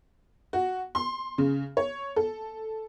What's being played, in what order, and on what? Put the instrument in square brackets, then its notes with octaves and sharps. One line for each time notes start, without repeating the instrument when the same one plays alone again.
[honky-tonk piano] F#4
C6
C#3
C#5
A4